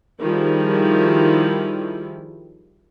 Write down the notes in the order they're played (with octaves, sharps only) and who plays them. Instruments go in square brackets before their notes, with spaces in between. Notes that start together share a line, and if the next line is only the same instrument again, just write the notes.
[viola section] D#3 F3 G3 E4 G#4